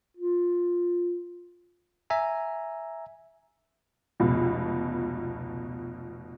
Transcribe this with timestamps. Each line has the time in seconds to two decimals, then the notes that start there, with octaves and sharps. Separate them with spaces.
0.17 F4
2.10 E5 G#5 A#5
4.20 F1 C#2 B2